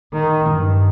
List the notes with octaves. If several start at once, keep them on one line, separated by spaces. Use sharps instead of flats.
D#3
G2